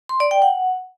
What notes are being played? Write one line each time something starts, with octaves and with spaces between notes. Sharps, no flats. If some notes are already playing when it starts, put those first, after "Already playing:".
C6
D5
G5
F#5